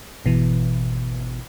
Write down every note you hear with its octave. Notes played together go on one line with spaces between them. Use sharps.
G#1 B2 E3